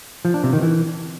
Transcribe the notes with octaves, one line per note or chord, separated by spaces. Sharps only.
F3
D4
C3
D#3
E3